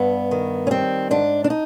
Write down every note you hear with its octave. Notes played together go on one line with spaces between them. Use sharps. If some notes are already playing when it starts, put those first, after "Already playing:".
Already playing: G2 B3
D#3
C#4
G3 C4
G#2 D4
D4
D#4